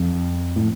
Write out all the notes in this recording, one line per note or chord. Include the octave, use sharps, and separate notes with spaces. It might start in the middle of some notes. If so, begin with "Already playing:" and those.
Already playing: F2
A2